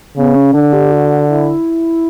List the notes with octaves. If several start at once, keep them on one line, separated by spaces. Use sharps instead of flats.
C#3 B3
C#4
D3 D4
G4
F#4
E4